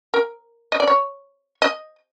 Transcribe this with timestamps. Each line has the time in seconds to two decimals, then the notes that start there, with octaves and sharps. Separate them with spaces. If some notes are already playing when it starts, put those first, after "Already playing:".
0.14 A#4
0.72 D#5
0.80 D5
0.87 C#5
1.62 D#5